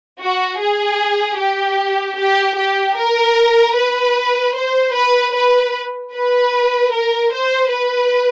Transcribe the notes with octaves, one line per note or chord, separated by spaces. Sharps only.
F#4
G#4
G4
G4
G4
A#4
B4
C5
B4
B4
B4
A#4
C5
B4